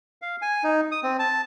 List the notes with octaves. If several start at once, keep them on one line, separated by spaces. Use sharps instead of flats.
F5
G#5
D#4
D#6
C4
A5